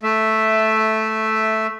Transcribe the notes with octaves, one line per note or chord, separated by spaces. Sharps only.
A3 E5